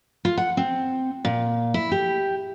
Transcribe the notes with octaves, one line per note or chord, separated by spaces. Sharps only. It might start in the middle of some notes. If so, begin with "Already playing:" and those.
F4
F#5
C4
A#2
E4
G4